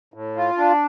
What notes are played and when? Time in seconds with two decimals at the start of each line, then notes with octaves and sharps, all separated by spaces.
0.14 A2
0.36 F4
0.58 D4